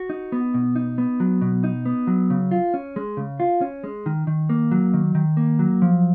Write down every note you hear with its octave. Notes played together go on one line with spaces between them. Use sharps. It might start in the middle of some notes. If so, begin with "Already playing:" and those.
Already playing: F#4
D#4
B3
B2
D#4
B3
F#3
B2
D#4
B3
F#3
C#3
F4
C#4
G#3
C#3
F4
C#4
G#3
D#3
D#3
A#3
F#3
D#3
D#3
A#3
F#3
F3